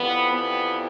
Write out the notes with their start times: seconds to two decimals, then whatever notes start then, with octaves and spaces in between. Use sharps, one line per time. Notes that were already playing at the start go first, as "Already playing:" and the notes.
Already playing: F2 E3 G3 B3
0.32 B3